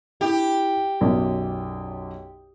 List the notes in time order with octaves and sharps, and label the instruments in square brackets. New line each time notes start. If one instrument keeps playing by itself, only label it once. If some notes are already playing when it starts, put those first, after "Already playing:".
[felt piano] E4 [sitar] G4
[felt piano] B1 F#2 D5